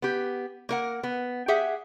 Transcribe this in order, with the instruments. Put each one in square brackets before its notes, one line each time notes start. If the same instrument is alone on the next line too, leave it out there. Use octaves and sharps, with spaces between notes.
[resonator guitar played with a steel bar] B3 G4
A#3 A#4 F#5
B3
G4 G#4 E5 F#5